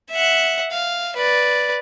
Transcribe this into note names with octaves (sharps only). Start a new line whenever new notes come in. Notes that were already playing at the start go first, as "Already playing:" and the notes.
E5 F#5
F5
B4 D5